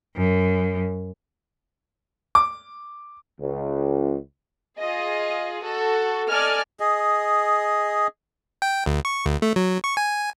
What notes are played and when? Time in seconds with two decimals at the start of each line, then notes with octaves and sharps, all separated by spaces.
0.15 F#2
2.35 D6
3.40 C#2
4.77 F4 G#4 D#5
5.64 F#4 A4
6.29 A4 D5 D#5 G#5 F6
6.80 G#4 D#5
8.62 G5
8.86 D2
9.05 C#6
9.26 D2
9.42 A3
9.56 F#3
9.84 C#6
9.97 G#5